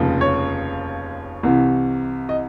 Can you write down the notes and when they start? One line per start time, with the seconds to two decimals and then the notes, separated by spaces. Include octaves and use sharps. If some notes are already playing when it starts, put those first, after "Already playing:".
Already playing: F1 D#2 C#3 F3
0.21 C#5
1.43 C2 C3 E3
2.29 D#5